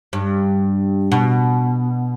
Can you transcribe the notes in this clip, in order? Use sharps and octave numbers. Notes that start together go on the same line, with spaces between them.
G2
B2